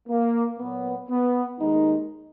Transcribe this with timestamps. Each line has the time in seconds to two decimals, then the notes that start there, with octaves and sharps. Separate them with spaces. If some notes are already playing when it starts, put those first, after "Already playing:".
0.09 A#3
0.59 A#2 F#3 B3
1.09 B3
1.60 D#2 D#3 G#3 D#4